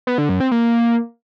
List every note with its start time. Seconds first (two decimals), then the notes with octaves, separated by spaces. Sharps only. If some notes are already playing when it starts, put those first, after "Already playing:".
0.07 B3
0.18 D3
0.29 F#2
0.40 C4
0.51 A#3